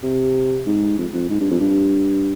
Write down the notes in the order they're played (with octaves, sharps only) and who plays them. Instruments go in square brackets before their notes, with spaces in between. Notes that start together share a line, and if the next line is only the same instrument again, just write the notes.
[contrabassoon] C3
G#2
F2
F2
G#2
G2
F2
G2